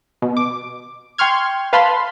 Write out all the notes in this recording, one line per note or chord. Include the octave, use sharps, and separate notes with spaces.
B2
D6
G5 C6 C#6 F6 G#6
B4 F5 A5 B5 C6